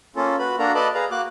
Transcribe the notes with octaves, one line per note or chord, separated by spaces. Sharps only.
A#3 C#4 F4 A4
F#4 B4 B5
A#3 D4 F#4 A4 A#4 A#5
A4 B4 D5 D#5 A5 B5
G#4 B4 F5 A#5
A#3 F#4 D6 F#6